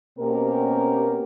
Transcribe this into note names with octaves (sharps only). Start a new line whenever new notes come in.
B2 A#3 C4 C#4 G4 A#4